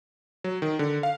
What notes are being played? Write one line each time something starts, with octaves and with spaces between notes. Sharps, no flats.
F#3
D#3
D3
F5